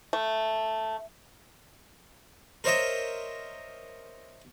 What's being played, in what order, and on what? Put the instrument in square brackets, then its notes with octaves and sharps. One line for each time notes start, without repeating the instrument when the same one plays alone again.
[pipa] A3
[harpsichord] A#4 C5 C#5 D#5 E5